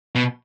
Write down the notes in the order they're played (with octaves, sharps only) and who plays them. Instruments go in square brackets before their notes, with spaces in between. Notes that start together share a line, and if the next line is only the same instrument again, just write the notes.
[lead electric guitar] B2